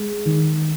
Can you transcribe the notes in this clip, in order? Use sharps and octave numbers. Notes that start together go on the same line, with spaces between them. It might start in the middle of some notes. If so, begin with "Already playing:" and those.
Already playing: G#3
D#3